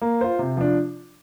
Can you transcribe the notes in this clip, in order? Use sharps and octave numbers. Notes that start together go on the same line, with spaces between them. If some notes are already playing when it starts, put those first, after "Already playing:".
A#3
F4 C5
C3
F3 D4